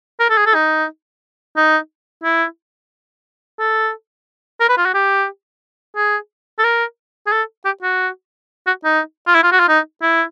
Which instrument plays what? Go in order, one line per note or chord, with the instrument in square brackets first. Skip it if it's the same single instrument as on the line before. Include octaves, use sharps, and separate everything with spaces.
[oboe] A#4
A4
G#4
A4
D#4
D#4
E4
A4
A#4
B4
F4
F#4
G4
G#4
A4
A#4
G#4
A4
G4
F#4
F#4
D#4
F4
E4
F4
F#4
F4
D#4
E4